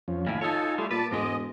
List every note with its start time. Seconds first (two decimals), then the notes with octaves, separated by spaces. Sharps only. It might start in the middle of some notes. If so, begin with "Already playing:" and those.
0.08 F2 F3 C#4
0.27 D#2 A2 F5 G#5 B5
0.41 D#4 F4 A4 C#5 G#5 A5
0.78 G3 A3 F4 A4 C6
0.91 A#2 B4 A5 D6
1.11 E1 G#2 G#3 D#5